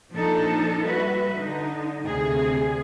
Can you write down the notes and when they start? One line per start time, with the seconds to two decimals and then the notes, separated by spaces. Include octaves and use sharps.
0.11 A#2 F3 D4 D#4 A4
0.85 G3 F#4 B4 E5
1.34 D3 D#4
2.03 D2 C3 G#4